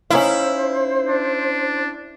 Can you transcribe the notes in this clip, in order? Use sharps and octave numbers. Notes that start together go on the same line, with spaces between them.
C#4 D#4 E4 C5 F5
D4